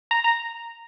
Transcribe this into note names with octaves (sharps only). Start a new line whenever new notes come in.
A#5
A#5